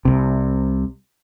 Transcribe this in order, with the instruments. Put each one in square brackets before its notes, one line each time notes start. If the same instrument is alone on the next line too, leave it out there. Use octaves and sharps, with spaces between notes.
[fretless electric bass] C2 C3